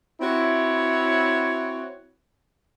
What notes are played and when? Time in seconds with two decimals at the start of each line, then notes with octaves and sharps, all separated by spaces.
0.20 C4 E4 F#4 C#5